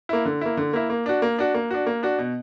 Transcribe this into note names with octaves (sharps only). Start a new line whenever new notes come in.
A#3 E4
D3
A#3 E4
D3
A#3 E4
A#3
D4 F#4
A#3
D4 F#4
A#3
D4 F#4
A#3
D4 F#4
B2